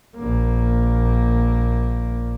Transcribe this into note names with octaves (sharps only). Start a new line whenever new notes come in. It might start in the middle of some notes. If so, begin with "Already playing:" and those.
A#1 A#3